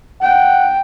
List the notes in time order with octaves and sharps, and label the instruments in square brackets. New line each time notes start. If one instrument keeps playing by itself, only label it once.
[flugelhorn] F#5 [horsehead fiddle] G5